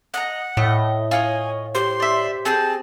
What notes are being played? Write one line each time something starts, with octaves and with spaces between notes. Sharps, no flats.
D#5 F#5 A#5
A2 D#5
F4 C#5 D#5 G#5
G4 C5 C6
D5 E5
C4 G#4 A5 G6